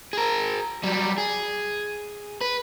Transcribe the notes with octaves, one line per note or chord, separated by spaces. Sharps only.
G#4 A#4
F#3 G3
G#4
B4